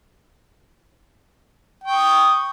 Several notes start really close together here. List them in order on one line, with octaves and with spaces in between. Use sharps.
G5 C#6 D#6